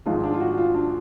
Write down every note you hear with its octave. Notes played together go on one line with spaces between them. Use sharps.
G#1 G#2 F3 G#3 F4
D4
F4
F#4
F4
D4